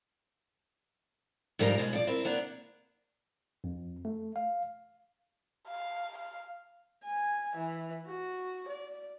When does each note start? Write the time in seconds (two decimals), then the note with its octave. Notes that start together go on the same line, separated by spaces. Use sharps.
1.59 G#2 F3 G3 A#4 B4 A#5
1.78 B2 G#3
1.93 F3 D5
2.07 C4 E4 A#4
2.25 A#3 B3 D4
3.64 F2
4.05 A3
4.36 F5
5.68 F5
6.18 F5
7.05 G#5
7.56 E3
8.08 F#4
8.68 D5